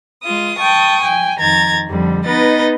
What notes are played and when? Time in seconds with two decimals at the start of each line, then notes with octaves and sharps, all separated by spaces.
0.23 G#3 F4 D#6
0.57 G5 A5 C#6 D#6
1.01 G5 G#5
1.39 F2 D#3 A#5 G#6 A6
1.87 F2 D3 G3
2.25 B3 D#4 B4 D#5 A6